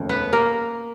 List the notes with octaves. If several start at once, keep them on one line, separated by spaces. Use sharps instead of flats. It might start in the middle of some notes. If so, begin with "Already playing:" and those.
Already playing: F1 D#2 C#3
B3 B4
A#3 A#4